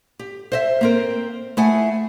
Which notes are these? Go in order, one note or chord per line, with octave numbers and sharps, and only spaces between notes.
G4
C5 D#5 E5
A#3 C4 A#4
A3 E4 G#4 F#5 G#5